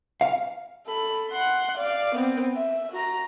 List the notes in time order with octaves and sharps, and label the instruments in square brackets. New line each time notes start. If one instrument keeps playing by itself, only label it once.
[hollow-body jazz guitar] F5
[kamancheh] A4 B5
F#5 C6
D5 F5
B3 C4
E5
F#4 A#5